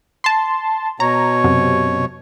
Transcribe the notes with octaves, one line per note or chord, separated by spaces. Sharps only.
A5 C6
B2 C#5 A#5
F#2 C3